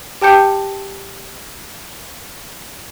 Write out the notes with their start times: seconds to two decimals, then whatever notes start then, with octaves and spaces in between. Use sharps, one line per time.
0.21 G4 G5 A5 G6 C#7